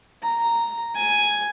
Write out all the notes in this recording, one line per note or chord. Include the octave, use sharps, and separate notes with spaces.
A#5
G#5